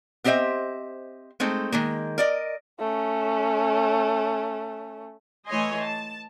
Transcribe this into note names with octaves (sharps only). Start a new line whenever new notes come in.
B3 C4 G4 C5 D#5 E5
G#3 A3 C4 D#4
D#3 G#3 A#3
A#4 D5 D#5
A3 C#4
E3 A3 C#5 D#5 G#5 C6
A5